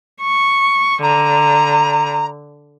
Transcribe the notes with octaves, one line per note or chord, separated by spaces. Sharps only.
C#6
D3 A#5